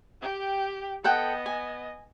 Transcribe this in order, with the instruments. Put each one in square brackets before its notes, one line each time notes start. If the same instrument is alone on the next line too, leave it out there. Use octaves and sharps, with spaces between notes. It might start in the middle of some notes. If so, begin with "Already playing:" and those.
[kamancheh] G4 G5
[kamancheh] B3 D#5 [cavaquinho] A4 F#5 G5
[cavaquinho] G#5